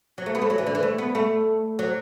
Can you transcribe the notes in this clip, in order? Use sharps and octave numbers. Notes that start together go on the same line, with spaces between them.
F#3
A3
B3
A3
F#3
E3
D3
E3
A3
B3
A3
F#3